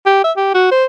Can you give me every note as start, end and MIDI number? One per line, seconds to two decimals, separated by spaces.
0.06 0.23 67
0.24 0.32 76
0.37 0.52 67
0.54 0.70 66
0.72 0.85 72